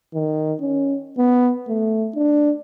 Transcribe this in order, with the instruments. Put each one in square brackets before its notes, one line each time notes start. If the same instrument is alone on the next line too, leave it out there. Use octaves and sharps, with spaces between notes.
[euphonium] D#3
C#4
B3
A3
D4